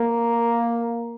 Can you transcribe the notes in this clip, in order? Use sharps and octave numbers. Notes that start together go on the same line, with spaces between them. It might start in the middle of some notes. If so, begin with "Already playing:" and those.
Already playing: A#3